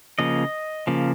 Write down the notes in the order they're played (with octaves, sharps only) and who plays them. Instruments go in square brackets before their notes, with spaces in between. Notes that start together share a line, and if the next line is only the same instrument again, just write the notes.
[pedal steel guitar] C#3 F3 A#3 D#5
C#3 F3 A#3